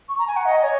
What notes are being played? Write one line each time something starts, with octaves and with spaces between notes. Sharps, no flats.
C#6
A#5
G#5
F#5
D#5
D#5
C#5